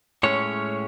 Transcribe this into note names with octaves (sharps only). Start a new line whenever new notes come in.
A2 G#3 C#4 C#5